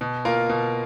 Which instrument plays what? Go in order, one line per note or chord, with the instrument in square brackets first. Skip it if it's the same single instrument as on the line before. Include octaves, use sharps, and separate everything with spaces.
[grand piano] B2
A#3 F4 A#4
B2